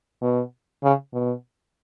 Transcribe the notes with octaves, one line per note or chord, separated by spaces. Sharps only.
B2
C#3
B2